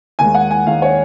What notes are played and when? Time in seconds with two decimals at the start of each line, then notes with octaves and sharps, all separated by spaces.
0.19 D#2 D#3 G#3 G#5
0.34 F#5
0.51 G#5
0.67 D#2 D#3 G#3 F5
0.82 C#5